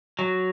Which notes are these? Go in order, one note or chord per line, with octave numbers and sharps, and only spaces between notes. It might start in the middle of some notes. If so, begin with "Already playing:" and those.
F#3